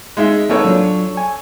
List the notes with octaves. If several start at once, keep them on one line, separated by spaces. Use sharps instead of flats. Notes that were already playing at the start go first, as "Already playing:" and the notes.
G#3 D#4 E5
A#3 B3 D#4 A4 C#5
F#3 D4 F4
G#5